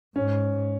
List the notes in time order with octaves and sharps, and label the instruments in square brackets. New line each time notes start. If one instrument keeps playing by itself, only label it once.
[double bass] G#2 [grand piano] C#4